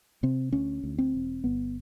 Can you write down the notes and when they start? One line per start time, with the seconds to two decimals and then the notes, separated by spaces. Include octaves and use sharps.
0.23 C3 C4
0.53 D2 C#4
0.84 D2
0.98 C4
1.15 E1
1.44 G1 B3